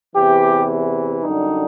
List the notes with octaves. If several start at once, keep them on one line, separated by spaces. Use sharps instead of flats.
E2 C3 E3 G4
F#2 D3 G3 D#4